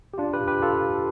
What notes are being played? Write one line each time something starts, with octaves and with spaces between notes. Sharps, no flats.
G4
D4 F4
G4 B4
G4 B4
F4 A4